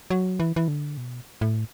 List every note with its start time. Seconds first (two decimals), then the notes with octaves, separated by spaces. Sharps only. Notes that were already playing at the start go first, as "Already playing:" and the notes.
0.10 F#3
0.40 E3
0.56 E3
0.68 D3
0.97 B2
1.41 A2